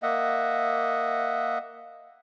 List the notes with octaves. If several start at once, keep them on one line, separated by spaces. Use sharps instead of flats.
A#3 D#5 E5 F#5